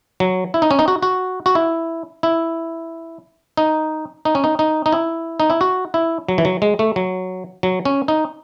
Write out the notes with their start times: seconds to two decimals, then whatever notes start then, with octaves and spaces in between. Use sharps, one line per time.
0.20 F#3
0.54 E4
0.62 D#4
0.71 C#4
0.79 D#4
0.88 F#4
1.02 F#4
1.46 F#4
1.55 E4
2.23 E4
3.57 D#4
4.25 D#4
4.35 C#4
4.44 D#4
4.59 D#4
4.86 D#4
4.92 E4
5.40 D#4
5.50 E4
5.61 F#4
5.94 E4
6.29 F#3
6.38 E3
6.45 F#3
6.62 G#3
6.79 A3
6.96 F#3
7.63 F#3
7.85 C#4
8.08 D#4